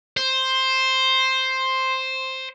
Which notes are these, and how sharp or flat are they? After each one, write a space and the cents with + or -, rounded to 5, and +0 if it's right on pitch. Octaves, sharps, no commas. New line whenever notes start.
C5 +5